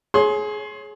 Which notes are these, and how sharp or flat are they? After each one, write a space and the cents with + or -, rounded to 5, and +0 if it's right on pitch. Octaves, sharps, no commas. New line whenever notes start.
G#4 +25 C#5 -15 C6 +15